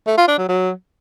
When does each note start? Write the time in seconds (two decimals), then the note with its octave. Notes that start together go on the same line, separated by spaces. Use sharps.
0.07 A3
0.17 F4
0.28 D4
0.38 F#3
0.49 F#3